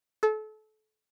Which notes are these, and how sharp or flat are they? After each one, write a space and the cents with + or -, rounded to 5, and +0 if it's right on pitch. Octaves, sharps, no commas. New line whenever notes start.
A4 -30